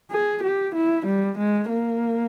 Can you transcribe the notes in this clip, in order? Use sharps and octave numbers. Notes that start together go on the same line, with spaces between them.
G#4
G4
E4
G3
G#3
A#3